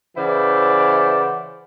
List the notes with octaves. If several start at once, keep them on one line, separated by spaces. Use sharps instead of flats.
C#3 E3 E4 C5 D5 F#5